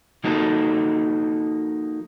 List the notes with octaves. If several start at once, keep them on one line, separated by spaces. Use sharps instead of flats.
F3 A#3 D#4 F#4 A4